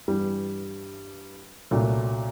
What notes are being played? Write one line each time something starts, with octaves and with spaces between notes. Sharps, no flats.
G2 E3 G3
C2 A#2 F#3 A3 D4